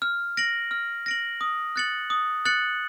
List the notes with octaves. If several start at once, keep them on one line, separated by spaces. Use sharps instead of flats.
F6
A#6 D7 F#7
F6
A#6 D7 F#7
D#6
F#6 A6 C#7 F#7
D#6
F#6 A6 C#7 F#7